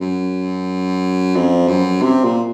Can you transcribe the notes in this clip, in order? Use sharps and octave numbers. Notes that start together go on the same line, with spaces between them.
F#2
F2
F#2
C3
A#2